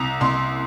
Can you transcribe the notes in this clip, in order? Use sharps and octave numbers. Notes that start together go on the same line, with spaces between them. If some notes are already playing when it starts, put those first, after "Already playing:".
Already playing: C2 A#5
C2 C6